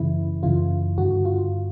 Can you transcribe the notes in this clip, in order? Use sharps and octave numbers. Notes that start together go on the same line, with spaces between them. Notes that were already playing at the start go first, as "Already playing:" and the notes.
Already playing: F#2 C#3 E3 E4
F#2 C#3 E3 F4
G2 D3 F#4
F4